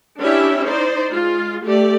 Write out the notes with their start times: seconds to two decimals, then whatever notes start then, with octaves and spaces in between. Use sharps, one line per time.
0.21 C#4 D4 E4 G4 E5
0.64 D#4 C5 D5
1.12 G#3 F4
1.65 A3 G4 D5